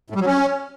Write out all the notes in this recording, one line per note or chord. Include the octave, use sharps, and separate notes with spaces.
A2
G3
F#3
C#4